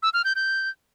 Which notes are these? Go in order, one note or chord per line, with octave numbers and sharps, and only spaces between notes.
E6
F6
G6
G6